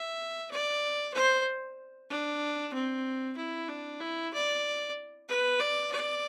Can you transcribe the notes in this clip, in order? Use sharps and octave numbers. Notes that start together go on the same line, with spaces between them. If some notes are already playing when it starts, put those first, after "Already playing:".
Already playing: E5
D5
C5
D4
C4
E4
D4
E4
D5
B4
D5
D5